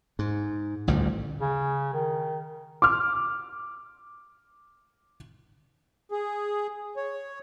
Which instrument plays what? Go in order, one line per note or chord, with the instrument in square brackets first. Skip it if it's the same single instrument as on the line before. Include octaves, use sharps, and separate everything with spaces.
[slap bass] G#2
A1 D2 A#2 G3
[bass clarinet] C#3
D#3
[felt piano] D6 F6
[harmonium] G#4
C#5